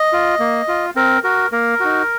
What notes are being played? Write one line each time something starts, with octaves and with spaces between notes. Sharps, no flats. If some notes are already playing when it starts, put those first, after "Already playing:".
Already playing: D#5
F4
A#3
F4
C4 A#4
F#4 A#4
A#3 A#4
D#4 F#4